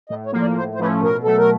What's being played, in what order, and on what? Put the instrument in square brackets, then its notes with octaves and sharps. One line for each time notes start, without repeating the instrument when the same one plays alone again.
[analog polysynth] A2 [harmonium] D#5
[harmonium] C#5
[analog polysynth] F3 A#3
[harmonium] D5
[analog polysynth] A2 [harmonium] C5
[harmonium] C5
[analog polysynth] F3 A3 C#4 [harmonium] B4
[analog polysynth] B2 [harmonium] A#4
[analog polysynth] F#3 A3 [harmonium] A4
[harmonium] A#4